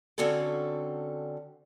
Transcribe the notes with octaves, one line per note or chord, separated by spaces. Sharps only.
D3 C4 C#4 F#4 A4